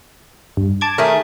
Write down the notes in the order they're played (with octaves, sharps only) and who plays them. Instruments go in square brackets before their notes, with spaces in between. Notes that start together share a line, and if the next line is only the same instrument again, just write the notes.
[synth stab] G2
A5 D6 G#6
[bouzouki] D#3 A3 G#4 [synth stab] A#4